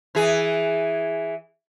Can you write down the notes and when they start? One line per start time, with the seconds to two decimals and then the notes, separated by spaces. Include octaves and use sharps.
0.15 E3 G#4